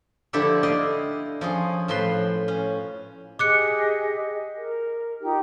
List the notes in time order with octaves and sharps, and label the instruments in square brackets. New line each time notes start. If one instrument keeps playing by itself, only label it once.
[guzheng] D3 F3 D4 E4 G4 A4
E4 D5 D#5 F5
F3 C#4 G#4
A2 F3 B4 C6
C#4
[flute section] G4 G#4 D#5 [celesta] D6 F#6 C#7
[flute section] A#4
D#4 F4 G4